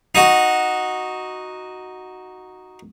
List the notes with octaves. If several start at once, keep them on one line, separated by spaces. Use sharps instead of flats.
D#4 F#4